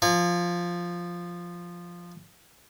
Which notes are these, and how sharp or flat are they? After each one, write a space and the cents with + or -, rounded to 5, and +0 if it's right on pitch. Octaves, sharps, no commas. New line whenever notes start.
F3 +0 G#5 -35